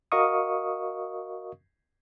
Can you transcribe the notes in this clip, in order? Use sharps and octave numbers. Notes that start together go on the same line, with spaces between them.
F#4 A#4 D#5 F5 C#6 D#6